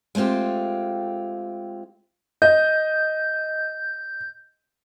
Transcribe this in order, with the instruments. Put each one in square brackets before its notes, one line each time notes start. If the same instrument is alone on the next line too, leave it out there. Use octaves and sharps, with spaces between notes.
[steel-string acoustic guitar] G#3 A3 C4 F4 G4
[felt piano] D#5 [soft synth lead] G6